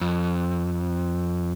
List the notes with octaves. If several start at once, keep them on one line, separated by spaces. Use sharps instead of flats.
F2